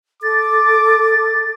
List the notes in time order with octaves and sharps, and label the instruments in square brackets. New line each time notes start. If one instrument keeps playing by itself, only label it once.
[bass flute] A4 [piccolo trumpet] D6 [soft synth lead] A6